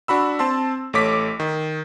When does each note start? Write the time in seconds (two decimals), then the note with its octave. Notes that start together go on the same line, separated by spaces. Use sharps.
0.08 D4 F#4 B5 E6
0.39 C4 A5 C6 E6
0.93 A1 A3 C#5 D6 B6
1.40 D#3